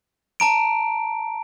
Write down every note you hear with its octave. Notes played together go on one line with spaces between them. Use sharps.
A5 A#5 D7